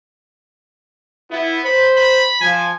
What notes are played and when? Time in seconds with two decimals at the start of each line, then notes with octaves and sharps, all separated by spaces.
1.31 B3 E4
1.65 C5 B5
1.97 B5
2.41 F3 G#5